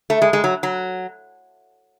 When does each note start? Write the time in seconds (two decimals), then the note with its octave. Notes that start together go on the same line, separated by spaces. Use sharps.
0.10 A3
0.22 G#3
0.33 G#3
0.44 F#3
0.63 F#3